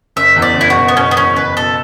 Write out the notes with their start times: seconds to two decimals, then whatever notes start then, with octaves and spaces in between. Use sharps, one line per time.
0.16 F#1 E5
0.36 E2
0.42 D5
0.56 F#1 E4
0.70 F#4
0.76 B2
0.88 B3
0.96 F#1 C#4
1.11 B3
1.16 E2 C#4
1.36 F#1 B4
1.56 B2 A4